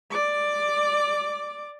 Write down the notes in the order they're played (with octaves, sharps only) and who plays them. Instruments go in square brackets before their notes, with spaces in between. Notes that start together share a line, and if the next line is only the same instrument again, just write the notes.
[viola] D5 D6